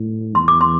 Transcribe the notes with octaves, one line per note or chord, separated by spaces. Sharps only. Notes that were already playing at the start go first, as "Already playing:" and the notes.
Already playing: A2
E2 C6
D6
C6